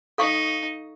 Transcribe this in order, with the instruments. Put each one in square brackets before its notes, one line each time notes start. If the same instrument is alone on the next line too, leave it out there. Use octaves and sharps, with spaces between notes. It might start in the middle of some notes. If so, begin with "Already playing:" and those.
[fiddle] D#4 [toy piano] A4 F5 C#6